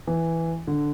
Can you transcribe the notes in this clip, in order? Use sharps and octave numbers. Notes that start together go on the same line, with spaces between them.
E3
D3